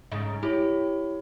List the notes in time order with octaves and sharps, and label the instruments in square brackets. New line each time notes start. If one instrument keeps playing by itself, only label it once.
[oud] G#2 C#3 D#4
[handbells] E4 C#5 [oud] G4